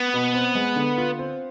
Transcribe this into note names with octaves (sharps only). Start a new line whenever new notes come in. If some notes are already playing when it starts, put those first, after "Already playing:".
Already playing: B3
B2
C4
G#3
D3
F4
C4